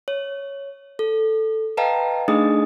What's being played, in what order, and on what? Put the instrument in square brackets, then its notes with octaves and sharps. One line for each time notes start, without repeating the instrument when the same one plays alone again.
[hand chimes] C#5
A4
B4 D#5 F5 G5 A5 A#5
A3 D4 D#4 G#4 D#5 D#6